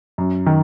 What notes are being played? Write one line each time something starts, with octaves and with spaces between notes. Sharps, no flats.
F#2
D#3